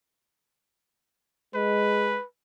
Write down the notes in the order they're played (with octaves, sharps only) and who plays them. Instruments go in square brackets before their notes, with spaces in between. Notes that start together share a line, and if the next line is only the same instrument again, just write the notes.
[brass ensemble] G#3 [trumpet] B4